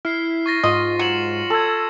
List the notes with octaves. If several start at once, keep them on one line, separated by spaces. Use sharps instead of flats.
E4 F6 C7
C#6 A6 A#6
G#2 F4 D#5
F#3 C#7 E7 F#7
A4 E6 G#6